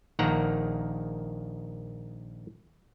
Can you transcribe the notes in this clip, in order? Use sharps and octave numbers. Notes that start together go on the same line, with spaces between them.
A#1 D#3 A#3 F#5 A#5